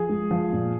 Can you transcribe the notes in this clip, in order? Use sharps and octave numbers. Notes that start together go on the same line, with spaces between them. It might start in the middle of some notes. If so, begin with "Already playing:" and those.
Already playing: F3 G#4
G#3
F3
A#2